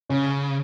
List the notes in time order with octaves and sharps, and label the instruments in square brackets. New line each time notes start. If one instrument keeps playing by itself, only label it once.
[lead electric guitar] C#3 [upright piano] C#4